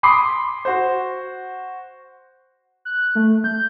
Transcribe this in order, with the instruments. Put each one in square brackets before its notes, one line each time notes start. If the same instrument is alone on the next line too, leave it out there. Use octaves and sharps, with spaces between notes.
[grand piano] B5 C6 D6 D#6 C7
F#4 C5
[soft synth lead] F#6
A3
G6